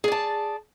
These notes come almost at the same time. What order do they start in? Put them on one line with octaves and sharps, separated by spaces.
G#4 D5 A5